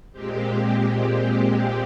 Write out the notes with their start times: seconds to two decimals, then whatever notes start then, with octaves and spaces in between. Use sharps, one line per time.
0.12 A#2 G#3 C4 G4